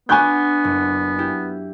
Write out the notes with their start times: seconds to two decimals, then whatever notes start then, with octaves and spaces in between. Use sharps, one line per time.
0.09 B3 D4 F#5 G#5 B5 C#6 G6
0.64 F#1
1.19 E4 G4